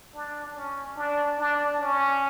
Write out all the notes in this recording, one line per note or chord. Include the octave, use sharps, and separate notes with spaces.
D4
C#4
D4
D4
C#4